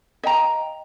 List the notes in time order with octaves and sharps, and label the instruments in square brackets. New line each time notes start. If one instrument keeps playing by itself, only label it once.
[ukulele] D#5 F5 G5 A#5